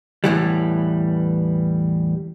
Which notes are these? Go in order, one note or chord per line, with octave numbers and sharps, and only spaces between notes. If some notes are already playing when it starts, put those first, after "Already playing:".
E2 A2 E3 G3